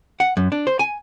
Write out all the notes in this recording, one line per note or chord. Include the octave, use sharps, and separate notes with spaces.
F#5
F#2
D4
C5
G#5